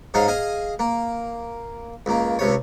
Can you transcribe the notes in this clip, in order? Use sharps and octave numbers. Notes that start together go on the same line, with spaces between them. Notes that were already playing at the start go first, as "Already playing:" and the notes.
G#2 C#4 D#4 G#4 F5
G#4 D#5 F5
A#3
C#2 A#3
C#2 C3 C#5